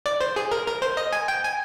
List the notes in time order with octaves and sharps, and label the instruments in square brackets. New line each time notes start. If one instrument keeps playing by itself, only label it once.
[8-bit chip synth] D5
C5
G#4
A#4
A#4
C5
D#5
G#5
G5
G#5